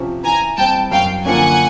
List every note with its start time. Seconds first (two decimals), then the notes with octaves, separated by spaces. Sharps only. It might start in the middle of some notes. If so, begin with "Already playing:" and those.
Already playing: C3 F3 C#4
0.23 E3 G#5 A#5
0.58 G3 C4 G5 A5
0.91 F#2 F5 G5
1.25 D3 F3 A#3 C#4 F#5 G#5